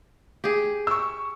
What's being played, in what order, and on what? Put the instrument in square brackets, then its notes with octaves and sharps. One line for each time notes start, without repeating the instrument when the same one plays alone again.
[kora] G4 G#4
[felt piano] C#6 E6